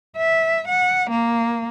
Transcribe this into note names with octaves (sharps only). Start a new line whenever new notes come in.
E5
F#5
A#3